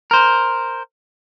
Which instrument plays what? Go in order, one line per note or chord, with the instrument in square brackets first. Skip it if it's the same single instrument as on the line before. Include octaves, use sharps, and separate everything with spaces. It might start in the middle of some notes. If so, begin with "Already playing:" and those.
[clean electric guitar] A#4 C5